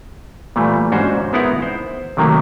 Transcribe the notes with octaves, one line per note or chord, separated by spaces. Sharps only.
A#2 E3 G3 A3
G#2 C#4 D4 F#4 C5
G#3 B3 D#4 E4 A#4 F#5
C5
C3 D#3 F#3 A3 A#3